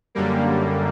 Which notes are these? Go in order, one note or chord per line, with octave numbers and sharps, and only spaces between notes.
F#2 D3 G3 A#3